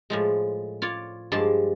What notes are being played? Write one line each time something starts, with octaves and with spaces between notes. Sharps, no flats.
A2 F3 G#3
F4 C#5 D5
G2 F3 G#3 D5 A5 C6